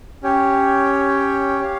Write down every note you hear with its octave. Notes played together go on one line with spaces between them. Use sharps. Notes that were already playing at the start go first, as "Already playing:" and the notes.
C#4 G4 C#5 G5
G4 C#5 F5